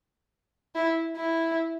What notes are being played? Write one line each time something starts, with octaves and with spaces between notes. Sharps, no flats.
E4
E4